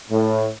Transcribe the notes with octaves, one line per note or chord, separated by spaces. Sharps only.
A2